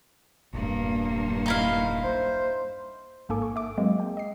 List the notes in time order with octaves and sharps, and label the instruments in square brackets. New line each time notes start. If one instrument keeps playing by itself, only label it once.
[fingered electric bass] E1 A#1 [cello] G2 A#3
[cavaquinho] D#4 E4 F5
[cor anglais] C5
[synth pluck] A1 G#2 A#3 A4 G#5 D6
C#6
E5 D6
F#3 G#3 A#3 C4
G5
D#5 C7